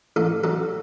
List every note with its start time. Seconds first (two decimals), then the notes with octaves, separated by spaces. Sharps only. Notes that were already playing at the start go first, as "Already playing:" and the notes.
0.16 A1 A4
0.44 F#3 A4